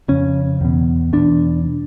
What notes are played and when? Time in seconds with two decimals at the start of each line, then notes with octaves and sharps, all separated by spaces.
0.08 F2 C#3 C#4
0.61 E2 B2
1.13 E2 B2 D4